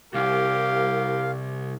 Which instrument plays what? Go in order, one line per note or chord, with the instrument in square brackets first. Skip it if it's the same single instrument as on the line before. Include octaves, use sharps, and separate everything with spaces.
[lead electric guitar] C2 [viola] G4 A#4 [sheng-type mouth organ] F5